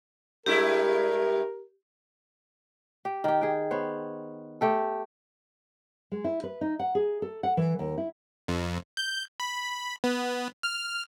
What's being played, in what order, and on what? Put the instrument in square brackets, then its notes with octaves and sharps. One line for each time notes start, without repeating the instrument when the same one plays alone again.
[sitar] G2 G#3 E4 [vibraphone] G4 [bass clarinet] A#4
[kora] G4
D#3 G4
G#4 G5
B3 C5 C#5
A3 G4 A4
[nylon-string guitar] G#3
E4
B4
D#4
F#5
G#4
A4
F#5
E3
D#2
E4
[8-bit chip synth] F2
G6
B5
B3
F6